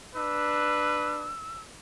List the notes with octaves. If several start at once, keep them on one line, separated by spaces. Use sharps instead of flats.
D4 B4 E6